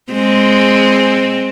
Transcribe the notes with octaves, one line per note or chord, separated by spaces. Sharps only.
G#3 C4